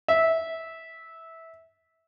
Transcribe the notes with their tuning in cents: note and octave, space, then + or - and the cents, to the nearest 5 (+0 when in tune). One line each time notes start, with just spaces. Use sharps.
E5 -15